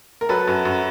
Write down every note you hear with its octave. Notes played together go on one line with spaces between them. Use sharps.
A#4
F#3 A4 B4
F#2
F#2